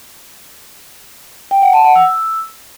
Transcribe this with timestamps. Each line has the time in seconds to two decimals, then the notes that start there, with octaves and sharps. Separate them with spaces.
1.51 G5
1.62 F#5
1.73 A5
1.84 F#5
1.96 E6